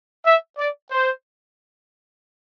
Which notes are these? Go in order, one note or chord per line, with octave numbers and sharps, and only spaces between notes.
E5
D5
C5